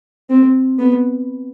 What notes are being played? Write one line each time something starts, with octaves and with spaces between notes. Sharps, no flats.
C4
B3